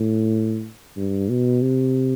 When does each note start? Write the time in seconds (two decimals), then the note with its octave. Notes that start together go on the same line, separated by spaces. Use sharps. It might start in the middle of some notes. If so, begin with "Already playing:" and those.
Already playing: A2
0.96 G2
1.29 B2
1.62 C3